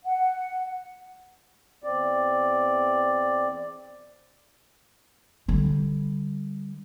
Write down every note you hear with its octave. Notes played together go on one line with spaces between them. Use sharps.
F#5
E2 C4 D5
D3 G3